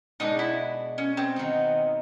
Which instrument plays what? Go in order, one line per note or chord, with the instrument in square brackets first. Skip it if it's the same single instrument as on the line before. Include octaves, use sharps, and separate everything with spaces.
[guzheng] B2 G#3 B3 D4 [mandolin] D#4
[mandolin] E4
C#4
C4
[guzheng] D#3 F#3 B3 D#4